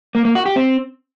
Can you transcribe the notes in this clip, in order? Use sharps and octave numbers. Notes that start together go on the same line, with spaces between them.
A#3
A#3
F#4
G4
C4